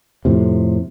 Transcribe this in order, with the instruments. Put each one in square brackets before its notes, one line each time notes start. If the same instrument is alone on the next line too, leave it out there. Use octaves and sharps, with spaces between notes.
[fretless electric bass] F2 A2 C3